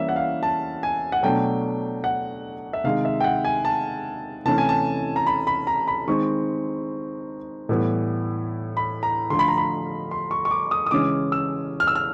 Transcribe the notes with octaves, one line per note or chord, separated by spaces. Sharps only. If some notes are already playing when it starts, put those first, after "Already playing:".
Already playing: E3 G3 A#3 C#4 E4 E5
F#5
F5
A5
G#5
F#5
B2 F#3 A3 D4 G5
F#5
E5
C3 D#3 G#3 F5
E5
G5
F#5
G#5
A5
C3 E3 A3 C#4 E4 A5
G#5
A5
A#5
B5
B5
A#5
B5
D#3 G#3 C4 D#4 C#6
A2 E3 G3 B3 E4
B5
A#5
D3 F3 A3 C6
B5
A#5
B5
C6
C#6
C#6
D6
D#6
D#6
C#3 E3 G#3 C#4 D6
E6
F6
E6
F6